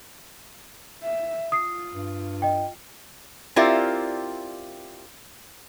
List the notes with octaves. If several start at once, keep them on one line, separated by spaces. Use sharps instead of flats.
E5
F4 D#6 C7
G2
D#5 G5
C4 E4 F4 G4 A#4 D5